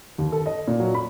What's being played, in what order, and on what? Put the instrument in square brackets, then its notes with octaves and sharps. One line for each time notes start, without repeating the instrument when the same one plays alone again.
[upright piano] D#2
A4
D#5
A#2
F#3
B5